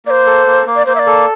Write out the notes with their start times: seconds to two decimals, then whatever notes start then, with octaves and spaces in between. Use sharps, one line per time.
0.05 A#3 D5
0.10 C5
0.26 A4
0.47 A#3
0.66 A#3
0.76 D5
0.86 A#3 C5
0.95 E5
0.99 D5
1.07 A4